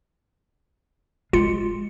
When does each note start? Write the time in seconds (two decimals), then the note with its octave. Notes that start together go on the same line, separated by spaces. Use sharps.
1.33 G#3 F4 C6 C#7